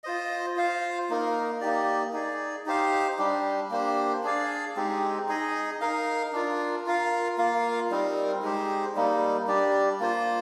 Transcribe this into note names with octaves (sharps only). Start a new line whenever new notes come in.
F4 C5 D#5
F4 C5 F5
A#3 D#4 A#4
A#3 D#4 G4 D5
D#4 G#4 D5
D#4 G4 C5 F5
G3 D4 G4
A#3 D4 G4 C5
D4 G#4 D5 F5
G#3 C4 D#4 G4
D#4 G#4 D#5
D#4 A#4 F5
D4 F4 A#4
F4 A#4 F5
A#3 F4 A#4 F5
G3 C4 D#4 A#4
G#3 D#4 G4 C5
G3 A#3 D#4
G3 D4 G4 D5
A#3 F4 C5